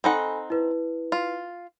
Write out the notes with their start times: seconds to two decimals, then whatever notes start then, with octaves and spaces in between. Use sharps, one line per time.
0.04 C4 D#4 A4 F#5 G#5 B5
0.50 E4 B4
1.12 F4